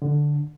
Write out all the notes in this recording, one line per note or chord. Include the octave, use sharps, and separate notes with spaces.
D3